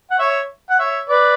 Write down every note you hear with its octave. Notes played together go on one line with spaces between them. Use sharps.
F#5
C#5 E5
F#5
C#5 E5
B4 D5